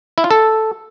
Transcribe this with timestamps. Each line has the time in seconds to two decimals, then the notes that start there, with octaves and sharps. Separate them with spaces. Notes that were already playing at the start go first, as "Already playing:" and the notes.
0.18 E4
0.24 F4
0.31 A4